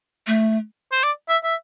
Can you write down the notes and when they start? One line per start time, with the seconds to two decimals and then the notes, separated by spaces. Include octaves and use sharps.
0.27 A3
0.92 C5
1.03 D5
1.29 E5
1.44 E5